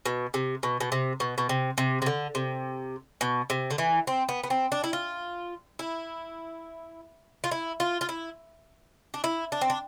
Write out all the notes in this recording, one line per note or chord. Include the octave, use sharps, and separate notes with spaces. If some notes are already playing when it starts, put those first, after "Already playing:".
B2
C3
B2
B2
C3
B2
B2
C3
C3
C3
D3
C3
B2
C3
D3
E3
C4
B3
B3
C4
D4
E4
F4
E4
F4
E4
F4
F4
E4
D4
E4
D4
C4
D4